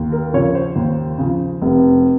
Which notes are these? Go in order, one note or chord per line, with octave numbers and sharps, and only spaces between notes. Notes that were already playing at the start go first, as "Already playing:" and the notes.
Already playing: D#2
A#4
C#3 F3 C#5
C5
D#2
C#3 F3
F1